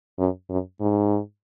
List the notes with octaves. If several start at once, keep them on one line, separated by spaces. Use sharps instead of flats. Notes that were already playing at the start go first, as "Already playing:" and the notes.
F#2
F#2
G#2